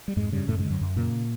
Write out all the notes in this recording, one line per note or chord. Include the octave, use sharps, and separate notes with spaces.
G3
F2 G#2 G#3
G2 C#3 G3
F#2 A2 A3
G#2 G#3
D3
F#2 F#3
F#2
A#2 C#3 A#3